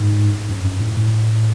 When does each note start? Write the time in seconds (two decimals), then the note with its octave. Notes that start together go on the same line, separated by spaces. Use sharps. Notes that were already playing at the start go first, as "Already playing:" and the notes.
Already playing: G#2
0.49 F#2
0.64 F#2
0.80 A2
0.97 A2